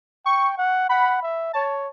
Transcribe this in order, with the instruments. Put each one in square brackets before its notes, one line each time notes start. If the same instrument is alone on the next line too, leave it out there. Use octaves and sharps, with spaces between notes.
[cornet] G5 [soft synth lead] C#6
[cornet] F#5
[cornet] F#5 [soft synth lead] B5
[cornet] E5
[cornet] C#5 [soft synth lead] A5